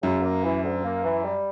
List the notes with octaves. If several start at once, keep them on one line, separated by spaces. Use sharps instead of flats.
F#2 C#3
A#3
E3
D2
A#3
E3
G3